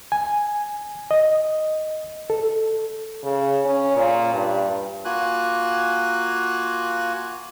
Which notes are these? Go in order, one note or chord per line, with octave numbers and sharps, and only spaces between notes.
G#5
D#5
A4
C#3
C#4
A#2
G2
A#3 F4 F#4 G#5 F#6